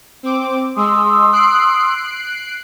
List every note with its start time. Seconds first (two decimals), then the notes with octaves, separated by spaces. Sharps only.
0.23 C4 D6
0.76 G#3 C6 D#6 E6
1.32 F#6 C7 D7